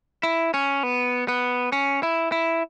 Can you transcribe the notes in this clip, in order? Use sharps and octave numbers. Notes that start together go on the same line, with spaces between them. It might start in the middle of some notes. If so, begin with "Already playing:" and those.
E4
C#4
B3
B3
C#4
E4
E4